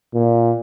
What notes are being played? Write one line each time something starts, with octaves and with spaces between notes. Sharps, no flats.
A#2